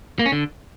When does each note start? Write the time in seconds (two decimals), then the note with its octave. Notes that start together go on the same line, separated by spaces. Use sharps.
0.19 A#3
0.26 C#4
0.32 D3